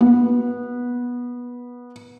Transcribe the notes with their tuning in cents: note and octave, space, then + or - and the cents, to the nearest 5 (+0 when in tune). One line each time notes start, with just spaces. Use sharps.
B3 -15